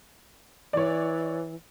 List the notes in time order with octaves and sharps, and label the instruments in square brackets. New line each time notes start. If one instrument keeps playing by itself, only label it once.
[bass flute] E3 [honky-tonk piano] C#5 D5